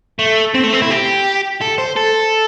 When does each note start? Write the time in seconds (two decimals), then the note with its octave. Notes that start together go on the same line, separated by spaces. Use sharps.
0.19 A3
0.54 C4
0.64 A3
0.73 C4
0.82 E4
0.90 G4
1.62 A4
1.78 C5
1.97 A4